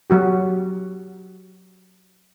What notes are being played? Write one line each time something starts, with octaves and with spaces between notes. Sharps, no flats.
F#3 F#4 G4